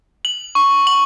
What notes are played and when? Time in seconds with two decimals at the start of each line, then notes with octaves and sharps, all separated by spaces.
0.25 F#7
0.55 C#6
0.87 F#7